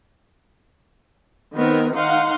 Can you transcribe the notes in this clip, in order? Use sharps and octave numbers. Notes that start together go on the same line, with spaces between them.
D#3 B3 C4 A#4
D#3 D#4 F5 F#5 C6